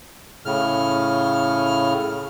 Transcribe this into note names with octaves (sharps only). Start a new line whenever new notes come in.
A2 C#3 F6